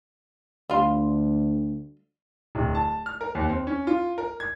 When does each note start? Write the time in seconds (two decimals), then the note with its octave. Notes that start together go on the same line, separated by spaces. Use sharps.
0.70 D2 G3 F4
2.55 D1
2.75 A5
3.06 F6
3.21 A#4
3.35 D#2
3.49 C4
3.67 C#4
3.87 F4
4.18 A#4
4.40 G#6